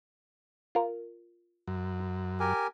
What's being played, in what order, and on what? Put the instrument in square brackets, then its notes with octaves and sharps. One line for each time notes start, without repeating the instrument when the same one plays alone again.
[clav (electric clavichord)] F4 A#4
[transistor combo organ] F#2
[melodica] G4 A#4 G#5